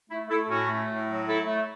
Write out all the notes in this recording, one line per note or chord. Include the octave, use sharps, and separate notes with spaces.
A3 E4
A3 E4 A4
A2 C#4 F#4
A3
A2
F#3
A3 E4 A4
A3